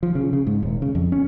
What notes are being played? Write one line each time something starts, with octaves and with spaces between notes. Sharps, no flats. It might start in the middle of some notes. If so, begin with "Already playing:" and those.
F3
C#3
C#3
G#2
D#1
C#3
F2
C#4